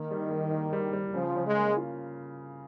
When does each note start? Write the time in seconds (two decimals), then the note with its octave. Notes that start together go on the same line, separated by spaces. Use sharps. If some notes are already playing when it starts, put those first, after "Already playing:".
Already playing: D#3 A#3
0.11 G3
0.31 G3
0.52 A#3
0.73 G3
0.93 G3
1.14 C#3 F3
1.35 C#3
1.46 G#3
1.57 A#3
1.77 F4